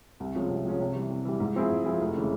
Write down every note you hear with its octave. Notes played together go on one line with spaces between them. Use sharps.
C2
C3 F3 G#3 C#4
C2
C3 F3 G#3 C#4
C3
E3 G3
C3
E3 G3
G#2
F3 C4 E4 G#4
G#2
F3 C4 E4 G#4
F1
C#3 E3 G#3